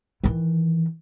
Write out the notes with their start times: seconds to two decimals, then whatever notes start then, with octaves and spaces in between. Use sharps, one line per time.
0.24 D#3 E3